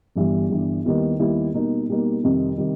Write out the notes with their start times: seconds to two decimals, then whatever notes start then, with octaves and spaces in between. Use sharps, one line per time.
0.16 G1 G2 E3 G3
0.50 G1 G2 E3 G3
0.85 D#2 D#3 G3 B3 E4
1.19 D#2 D#3 G3 B3 E4
1.53 B2 G3 A#3 D#4
1.88 B2 G3 A#3 D#4
2.23 F2 C3 D#3 G3
2.58 C3 D#3 G3